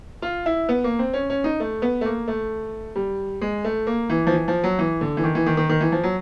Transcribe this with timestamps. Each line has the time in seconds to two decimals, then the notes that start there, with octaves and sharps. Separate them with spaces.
0.22 F4
0.46 E4
0.69 B3
0.84 A#3
0.99 C4
1.13 C#4
1.30 C#4
1.44 D#4
1.60 A3
1.82 B3
2.01 A3
2.06 A#3
2.28 A3
2.96 G3
3.41 G#3
3.64 A3
3.87 A#3
4.10 E3
4.27 F3
4.33 E3
4.48 F3
4.64 F#3
4.79 E3
5.01 D3
5.17 E3
5.24 D#3
5.35 E3
5.46 D#3
5.57 D#3
5.69 D#3
5.81 E3
5.92 F3
6.03 F#3